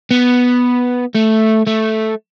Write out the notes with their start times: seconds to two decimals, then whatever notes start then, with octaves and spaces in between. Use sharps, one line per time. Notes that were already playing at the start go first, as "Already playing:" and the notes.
0.11 B3
1.15 A3
1.67 A3